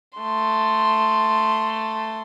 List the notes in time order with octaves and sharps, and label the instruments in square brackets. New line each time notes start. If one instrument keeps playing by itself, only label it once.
[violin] A3 C6